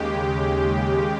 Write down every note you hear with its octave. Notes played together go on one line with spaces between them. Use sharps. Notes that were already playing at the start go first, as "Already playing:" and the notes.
Already playing: D#2 C#3 G#3 G4